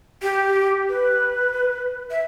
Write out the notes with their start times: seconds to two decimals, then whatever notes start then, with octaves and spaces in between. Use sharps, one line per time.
0.22 G4
0.89 B4
2.11 E5